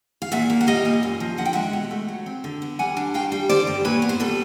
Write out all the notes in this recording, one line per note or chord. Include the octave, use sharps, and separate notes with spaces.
F5
A#2 E5 F#5
A#3
F#5
G3 D#5 F5
A#2
F#2
F3
D3 F#5
G5
G#3 E5 F#5
B2
A3
F#3
C4
D3
B3
G3 F#5 G#5
D4
G2 F5 G5
G3
D3 C5 D5
G2
A#2 B4 C#5
B3
C5
G3 A4 B4